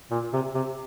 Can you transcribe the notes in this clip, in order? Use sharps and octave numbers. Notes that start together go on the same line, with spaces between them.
A#2
C3
C3